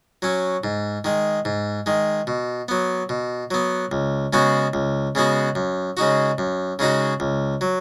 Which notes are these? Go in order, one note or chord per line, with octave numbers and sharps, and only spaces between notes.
F#3 C#4
G#2
D#3 G#3
G#2
D#3 G#3
B2
F#3 B3
B2
F#3 B3
C#2
C#3 G#3 B3 F#4
C#2
C#3 G#3 B3 F#4
F#2
C#3 G#3 D#4 F#4
F#2
C#3 G#3 D#4 F#4
C#2
F#3